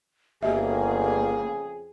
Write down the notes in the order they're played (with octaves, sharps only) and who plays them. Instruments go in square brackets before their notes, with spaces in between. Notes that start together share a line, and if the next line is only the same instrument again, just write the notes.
[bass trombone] G1 [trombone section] F2 C#3 G#4 [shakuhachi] A#3 [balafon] G4 D#5 E5